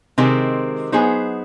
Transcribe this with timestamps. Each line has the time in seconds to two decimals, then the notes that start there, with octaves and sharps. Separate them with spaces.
0.18 C3 D#3 G#3 C4
0.92 F#3 B3 D#4 G#4 C5